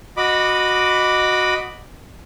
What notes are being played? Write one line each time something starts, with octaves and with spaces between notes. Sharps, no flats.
F#4 D#5 B5 D6